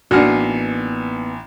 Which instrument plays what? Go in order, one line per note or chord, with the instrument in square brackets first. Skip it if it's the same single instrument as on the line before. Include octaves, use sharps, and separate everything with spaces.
[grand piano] A1 G#5 F6 [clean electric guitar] A#3 B3 D#4 [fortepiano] D4 F#4